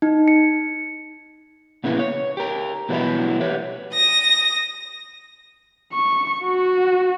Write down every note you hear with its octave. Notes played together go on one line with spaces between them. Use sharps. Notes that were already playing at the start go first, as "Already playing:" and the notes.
D#4
C#7
A#2 C#3 B3 E4
C#5
G4 A#4
B2 E3 F#3 G3 B3 E4
G4 B4 C#5
D#6 A#6
C#6
F#4